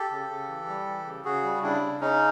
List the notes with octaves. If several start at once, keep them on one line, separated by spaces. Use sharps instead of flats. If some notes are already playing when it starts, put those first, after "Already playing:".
Already playing: G4 A4
C#3
C#3
E3
G3
E3
C#3
C#3 F#4 G#4
G3
C#3 D4 E4
C#3
C#3 C#4 D#4